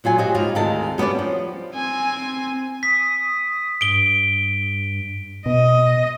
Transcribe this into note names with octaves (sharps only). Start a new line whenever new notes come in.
A#2 F#3 F4 G#5
F#4 G4 C5 D#5
G#2 G3 F4 F5
D2 C3 D#3 G#3 A5
G3 B3 C#4 D4 D5
F3
C4 G#5
D#6 B6
G2 D7 G7
B2 D#5